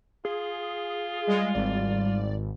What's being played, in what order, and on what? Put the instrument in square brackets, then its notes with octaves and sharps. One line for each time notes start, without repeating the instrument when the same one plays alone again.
[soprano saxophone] F4 [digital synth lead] G#4
[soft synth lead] G3 [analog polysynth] G#3
[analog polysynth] G#1 [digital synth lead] D5